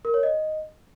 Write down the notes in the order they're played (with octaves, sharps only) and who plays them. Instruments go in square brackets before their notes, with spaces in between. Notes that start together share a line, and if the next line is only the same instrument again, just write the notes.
[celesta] A#4
C#5
D#5